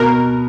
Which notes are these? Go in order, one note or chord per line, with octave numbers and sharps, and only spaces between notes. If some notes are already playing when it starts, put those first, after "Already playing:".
Already playing: B2 A#4